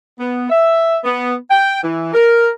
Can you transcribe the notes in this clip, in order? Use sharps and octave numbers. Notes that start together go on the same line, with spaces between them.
B3
E5
B3
G5
E3
A#4